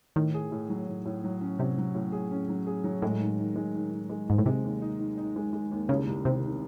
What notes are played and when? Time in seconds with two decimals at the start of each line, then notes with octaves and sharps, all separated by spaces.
0.16 A2 D#3
0.34 G#4
0.52 A2
0.69 F#3
0.87 A2
1.05 A2
1.24 F#3
1.41 C#4
1.59 C3 F#3
1.78 F#3
1.94 A2
2.12 G#4
2.31 C#4
2.48 F#3
2.67 G#4
2.84 F#3
3.02 A2 G#3
3.20 D#3
3.38 D#3
3.56 G#3
3.75 D#3
3.92 D#3
4.09 G#3
4.27 G#2 D#3
4.38 A2
4.46 C3 G#3
4.64 D#2
4.82 D#4
4.99 D#3
5.18 D#4
5.36 G#3
5.53 G#3
5.71 D#2
5.89 C2 C#3
6.07 C2
6.25 C3 D#3
6.43 D#3